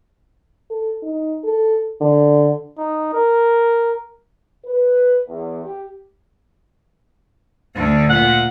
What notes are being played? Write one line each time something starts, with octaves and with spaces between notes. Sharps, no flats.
A4
D#4
A4
D3
D#4
A#4
B4
E2
G4
D2 D3
A#2 F#5